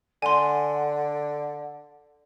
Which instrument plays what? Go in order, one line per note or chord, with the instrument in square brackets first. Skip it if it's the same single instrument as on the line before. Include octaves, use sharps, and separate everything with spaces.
[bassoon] D3 [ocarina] F#5 [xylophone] G#5 C6